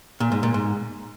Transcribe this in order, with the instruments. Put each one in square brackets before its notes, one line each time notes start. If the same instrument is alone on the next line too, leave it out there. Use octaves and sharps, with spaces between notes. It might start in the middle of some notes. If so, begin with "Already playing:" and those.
[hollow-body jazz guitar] A#2
G#2
A#2
G#2